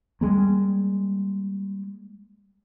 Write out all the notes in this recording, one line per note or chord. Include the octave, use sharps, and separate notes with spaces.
G3 G#3 A#3